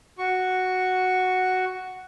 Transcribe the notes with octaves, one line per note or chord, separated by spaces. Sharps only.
F#4 C#6